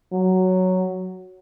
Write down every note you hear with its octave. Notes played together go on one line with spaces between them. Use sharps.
F#3